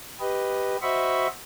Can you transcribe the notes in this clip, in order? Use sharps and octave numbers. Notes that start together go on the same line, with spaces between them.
G4 B4 D#5
F#4 C5 D#5 E5 B5 C#6